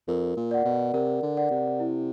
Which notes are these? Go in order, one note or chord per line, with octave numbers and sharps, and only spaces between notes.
F2 A#4
A#2
D5 F#5
B2
C3 A#4
D3
D5 F#5
C3
E4